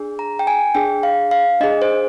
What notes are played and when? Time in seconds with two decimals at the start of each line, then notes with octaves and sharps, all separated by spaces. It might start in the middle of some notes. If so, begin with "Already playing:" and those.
Already playing: D4 G#4
0.19 A#5
0.39 G5
0.47 G#5
0.75 D4 G#4 G5
1.03 F5
1.31 F5
1.60 D4 G#4 D#5
1.82 C5